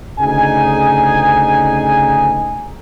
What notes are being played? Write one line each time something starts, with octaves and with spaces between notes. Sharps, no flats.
D2 C#3 D#4 G#4 G#5